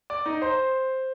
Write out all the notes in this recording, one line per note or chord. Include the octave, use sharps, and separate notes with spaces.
D5
D#4 D#5
C5 C6